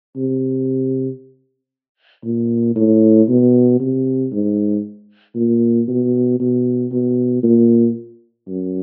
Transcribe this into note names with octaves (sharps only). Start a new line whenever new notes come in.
C3
A#2
A2
B2
C3
G#2
A#2
B2
B2
B2
A#2
F#2